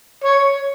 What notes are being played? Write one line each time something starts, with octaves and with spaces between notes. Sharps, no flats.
C#5